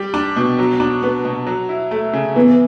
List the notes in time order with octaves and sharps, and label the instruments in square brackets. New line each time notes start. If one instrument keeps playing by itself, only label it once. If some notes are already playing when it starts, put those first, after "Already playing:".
Already playing: [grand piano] G3 G4
D4
B2
F#3
D4
B3
B2
F#3
E4
A3
C#3
[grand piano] E3 [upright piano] B3